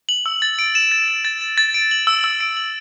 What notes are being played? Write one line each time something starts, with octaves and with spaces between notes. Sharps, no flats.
F#7
E6
A6
D7
E7
A6
E7
A6
E7
A6
D7
F#7
E6
E6
D7
F#7